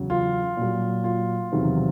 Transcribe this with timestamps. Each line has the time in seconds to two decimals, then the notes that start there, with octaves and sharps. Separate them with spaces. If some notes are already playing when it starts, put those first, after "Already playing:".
Already playing: E2 C#3 F#3
0.10 F4
0.57 A#2 F#3
1.04 F4
1.52 E2 C3 D#3 F#3